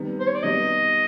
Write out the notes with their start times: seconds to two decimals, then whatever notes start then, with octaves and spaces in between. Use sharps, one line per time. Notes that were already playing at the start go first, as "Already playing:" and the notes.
Already playing: C3 D#3 G3 B3
0.20 C5
0.27 C#5
0.35 D5
0.43 C3 D#3 G3 B3 D#5